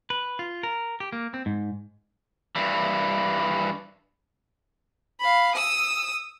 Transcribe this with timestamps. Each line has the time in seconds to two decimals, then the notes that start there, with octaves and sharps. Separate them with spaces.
0.10 B4
0.39 F4
0.63 A#4
1.00 G4
1.13 A#3
1.34 C4
1.46 G#2
2.56 G2 E3
5.20 F5 B5
5.55 D#6 E6